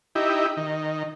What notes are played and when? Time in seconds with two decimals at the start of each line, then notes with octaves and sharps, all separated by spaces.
0.15 D#4 E4 G4
0.57 D#3